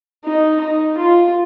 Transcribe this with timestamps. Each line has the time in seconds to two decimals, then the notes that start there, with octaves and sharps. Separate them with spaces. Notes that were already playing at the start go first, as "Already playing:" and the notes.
0.25 D#4
0.61 D#4
0.97 F4